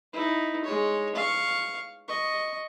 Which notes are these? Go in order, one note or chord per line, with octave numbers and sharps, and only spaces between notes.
D#4 E4
G#3 C#5
F5 C#6
D#5 C#6